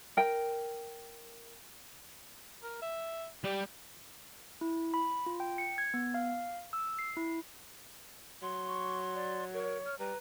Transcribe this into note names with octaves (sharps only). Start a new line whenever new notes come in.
A#4 G5
A#4
E5
G3 G4
E4
B5
F4
G5
C#7
G#6
B3
F5
E6
C7
E4
F#3 C6
C#6
D5
A#4 C#5
F6
G3 B4 A#5